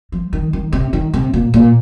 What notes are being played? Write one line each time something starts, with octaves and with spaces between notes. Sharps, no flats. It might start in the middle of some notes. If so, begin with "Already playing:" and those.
F3
D#3
D#3
C3
D#3
C3
A#2
A#2